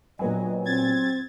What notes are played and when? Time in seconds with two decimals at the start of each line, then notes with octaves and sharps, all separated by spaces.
0.19 A#1 F#3 B3 D#5 G#5
0.65 C4 G#6 A6